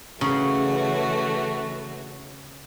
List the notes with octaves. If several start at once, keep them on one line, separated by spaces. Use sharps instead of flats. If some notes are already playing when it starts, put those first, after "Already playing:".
C#3 E3 A3 F#4